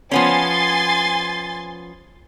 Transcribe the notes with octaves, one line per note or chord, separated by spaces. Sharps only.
F3 B3 C#4 G#5 C6 A6